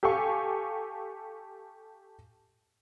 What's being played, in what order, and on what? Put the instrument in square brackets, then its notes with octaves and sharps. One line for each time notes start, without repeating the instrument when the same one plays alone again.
[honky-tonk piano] G4 A4 F5 G#5 C#6